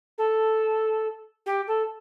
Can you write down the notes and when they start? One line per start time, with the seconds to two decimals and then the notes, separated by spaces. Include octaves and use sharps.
0.18 A4
1.46 G4
1.67 A4